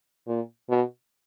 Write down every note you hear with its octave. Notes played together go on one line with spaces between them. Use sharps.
A#2
B2